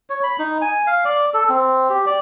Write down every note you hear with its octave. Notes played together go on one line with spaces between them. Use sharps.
C#5
B5
D#4
G#5
F5
D5
A4
C4
G4
D5